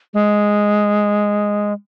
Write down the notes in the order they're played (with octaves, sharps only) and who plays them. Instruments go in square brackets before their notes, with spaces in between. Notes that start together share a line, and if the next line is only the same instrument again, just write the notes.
[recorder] G#3